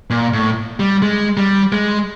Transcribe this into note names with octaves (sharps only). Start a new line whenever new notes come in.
A#2
A2
G3
G#3
G3
G#3